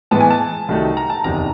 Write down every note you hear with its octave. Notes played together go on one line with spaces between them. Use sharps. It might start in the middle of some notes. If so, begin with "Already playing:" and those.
A2 E3 G#3 B3 A5
G#5
A5
C2 C3 D#3 F#3 A3
A#5
A5
F#1 E2 C3 D#3 A#5